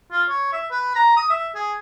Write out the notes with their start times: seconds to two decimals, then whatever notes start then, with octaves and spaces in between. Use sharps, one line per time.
0.11 F4
0.29 C#5
0.53 E5
0.71 B4
0.95 A#5
1.17 D#6
1.30 E5
1.55 G#4